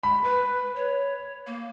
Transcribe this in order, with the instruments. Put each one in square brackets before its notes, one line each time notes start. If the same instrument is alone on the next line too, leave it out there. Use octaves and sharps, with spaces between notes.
[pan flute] G#3 [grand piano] B5
[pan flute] B4
C#5
A#3